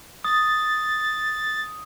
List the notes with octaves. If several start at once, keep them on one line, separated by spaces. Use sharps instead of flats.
D#6 A6